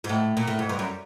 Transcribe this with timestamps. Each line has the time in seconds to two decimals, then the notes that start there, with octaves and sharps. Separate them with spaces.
0.04 G#2
0.09 A2
0.37 A#2
0.47 A2
0.59 G#2
0.69 G2
0.79 F#2